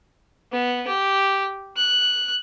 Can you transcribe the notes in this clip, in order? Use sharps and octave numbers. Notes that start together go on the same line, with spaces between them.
B3
G4
F#6